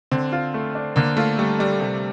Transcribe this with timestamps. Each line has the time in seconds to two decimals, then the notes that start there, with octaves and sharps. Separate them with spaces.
0.11 D3 C4
0.32 F4
0.54 A3
0.75 D4
0.96 D3 A#3
1.17 A3 F4
1.39 G3 A3
1.59 G3 D4
1.80 C3